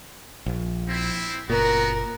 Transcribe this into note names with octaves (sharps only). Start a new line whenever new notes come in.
A#1
C4 E4
F#1 A#2 B3 F#4 A#4